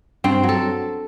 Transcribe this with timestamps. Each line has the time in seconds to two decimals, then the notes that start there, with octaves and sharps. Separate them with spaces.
0.24 G2 C4
0.43 F#3
0.49 A4